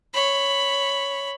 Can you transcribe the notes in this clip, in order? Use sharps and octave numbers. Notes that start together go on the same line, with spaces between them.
C#5 B5